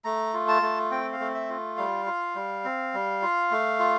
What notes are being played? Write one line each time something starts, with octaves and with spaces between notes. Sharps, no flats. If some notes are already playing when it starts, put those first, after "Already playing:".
A3 A#5
F4
A5
A3
C4 G5
F5
A3
E5
F4
G3 F5
F4
G3
C4
G3
F4
A3
F4